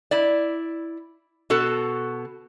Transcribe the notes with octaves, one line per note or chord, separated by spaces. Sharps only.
E4 D5
B2 F#4 A4